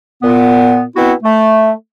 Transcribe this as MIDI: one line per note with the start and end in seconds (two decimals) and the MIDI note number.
0.22 0.83 46
0.22 0.83 59
0.96 1.12 47
0.96 1.12 59
0.96 1.12 60
0.96 1.12 64
0.96 1.12 66
1.23 1.72 57